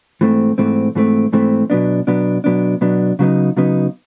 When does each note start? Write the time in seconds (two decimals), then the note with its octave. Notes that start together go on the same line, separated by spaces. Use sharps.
0.21 G#2 E3 A3 C4
0.58 G#2 E3 A3 C4
0.95 G#2 E3 A3 C4
1.33 G#2 E3 A3 C4
1.70 B2 F#3 B3 D4
2.07 B2 F#3 B3 D4
2.44 B2 F#3 B3 D4
2.81 B2 F#3 B3 D4
3.19 C#3 F#3 B3 D#4
3.57 C#3 F#3 B3 D#4